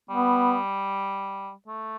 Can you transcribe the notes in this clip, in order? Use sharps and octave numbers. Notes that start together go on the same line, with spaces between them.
G3 B3
A3